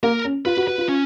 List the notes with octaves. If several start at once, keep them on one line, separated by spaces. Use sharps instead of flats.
A#3 A#4
C#4
F4 B4
F#4
F#4 B4
F4
C#4